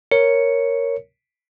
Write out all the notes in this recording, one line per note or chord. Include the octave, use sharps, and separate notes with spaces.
A#4 C#5 C#7